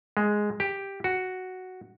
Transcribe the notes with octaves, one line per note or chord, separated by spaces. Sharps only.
G#3
G4
F#4